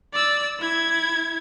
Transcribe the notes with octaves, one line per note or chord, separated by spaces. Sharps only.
D5 E6
E4 G#6